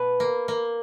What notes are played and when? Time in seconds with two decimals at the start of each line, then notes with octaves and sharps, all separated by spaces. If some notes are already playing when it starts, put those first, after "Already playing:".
Already playing: B2 B4
0.20 A#3
0.48 A#3